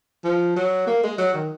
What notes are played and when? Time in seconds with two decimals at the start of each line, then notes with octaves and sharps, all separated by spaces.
0.24 F3
0.56 F#3
0.87 A#3
1.04 G#3
1.18 F#3
1.34 D#3